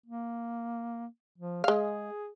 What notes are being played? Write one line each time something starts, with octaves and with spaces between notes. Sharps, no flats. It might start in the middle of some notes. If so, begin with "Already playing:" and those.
A#3
F3
G#3 G#4 F5